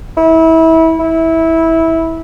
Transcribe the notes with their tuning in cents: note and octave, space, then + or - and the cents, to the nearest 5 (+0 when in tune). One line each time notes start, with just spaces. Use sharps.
E4 -25
E4 -15